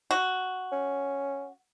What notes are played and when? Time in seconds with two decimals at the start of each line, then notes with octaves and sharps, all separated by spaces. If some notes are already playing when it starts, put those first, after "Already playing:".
0.11 F#4
0.72 C#4